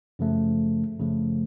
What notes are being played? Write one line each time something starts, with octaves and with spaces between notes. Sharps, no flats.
F#2 C#3 F3 A3
F#2 C#3 F3 A3